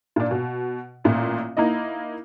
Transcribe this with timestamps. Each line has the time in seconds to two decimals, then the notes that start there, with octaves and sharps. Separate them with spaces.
0.16 A#2 D4
0.31 B2
1.04 A1 A#2
1.57 A#3 D#4 E4 D#5